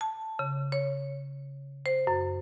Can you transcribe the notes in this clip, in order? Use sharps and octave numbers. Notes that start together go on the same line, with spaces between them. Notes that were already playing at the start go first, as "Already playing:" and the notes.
A5
C#3
C#5
C5
F#2